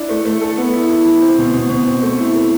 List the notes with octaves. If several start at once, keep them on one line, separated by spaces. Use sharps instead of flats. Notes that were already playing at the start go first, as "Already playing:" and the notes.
Already playing: D4 E4
A3
A3
A4
B3
E4
E4
E3
C4
B2
B2
B2
C4
A3
E4
A3